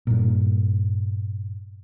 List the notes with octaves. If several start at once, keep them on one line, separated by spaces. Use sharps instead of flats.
G2 A#2